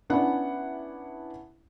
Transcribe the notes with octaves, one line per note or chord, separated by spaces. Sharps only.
B3 C#4 D4 E4 F#5